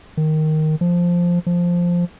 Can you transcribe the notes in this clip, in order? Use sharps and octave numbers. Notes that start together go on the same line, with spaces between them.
D#3
F3
F3